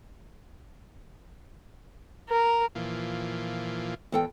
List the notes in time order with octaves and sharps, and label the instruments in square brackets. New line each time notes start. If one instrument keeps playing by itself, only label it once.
[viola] A#4
[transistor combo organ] A#2 E3 F3
[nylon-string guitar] E2 A4 G5